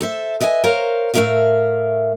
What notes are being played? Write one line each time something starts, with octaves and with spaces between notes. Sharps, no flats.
A4 C5 E5
B4 D#5 E5 F#5 G#5
A#4 C5 C#5 F5 A#5
A2 A3 C#4 A#4 E5 F5